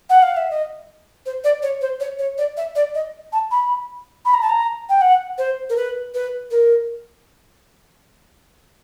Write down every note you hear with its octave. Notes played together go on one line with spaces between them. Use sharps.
F#5
F5
E5
D#5
C5
D5
C#5
C5
C#5
C#5
D5
E5
D5
D#5
A5
B5
B5
A#5
A5
A#5
G5
F#5
C5
A#4
B4
B4
A#4